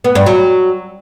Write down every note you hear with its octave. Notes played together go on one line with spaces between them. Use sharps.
B3
G2
F#3